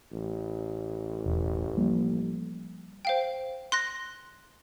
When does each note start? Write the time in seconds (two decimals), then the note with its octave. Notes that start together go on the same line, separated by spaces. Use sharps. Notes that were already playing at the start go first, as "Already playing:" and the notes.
0.12 A1
1.26 E1
1.77 F3 G3 A#3
3.05 C5 F5 G5
3.72 C6 F#6 A#6